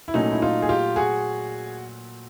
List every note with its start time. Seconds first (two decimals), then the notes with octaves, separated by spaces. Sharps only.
0.08 E4
0.14 A#2 F#3 A3 C#4 D#4
0.32 E4
0.42 D#4 F4
0.62 G#4
0.69 F4 G4
0.96 F#4 G#4